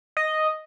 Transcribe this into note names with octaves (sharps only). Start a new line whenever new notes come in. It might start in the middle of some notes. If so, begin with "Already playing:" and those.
D#5